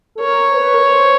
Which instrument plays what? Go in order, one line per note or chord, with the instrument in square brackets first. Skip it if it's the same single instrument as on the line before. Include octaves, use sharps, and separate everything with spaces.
[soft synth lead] A4
[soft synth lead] A#4 [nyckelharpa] C#5
[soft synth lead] C5
B4
A#4
B4
C5